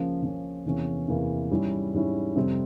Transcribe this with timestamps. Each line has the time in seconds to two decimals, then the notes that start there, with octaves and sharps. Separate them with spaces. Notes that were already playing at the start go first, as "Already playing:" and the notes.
Already playing: C#2 C#3 F3 A#3 C#4
0.22 C#2 C#3 F3 A#3 C#4
0.66 E2 C3 E3 A#3 C#4
1.08 E2 C3 E3 A#3 C#4
1.51 G#2 G3 C#4 E4
1.94 G#2 G3 C#4 E4
2.35 F2 C3 G3 C4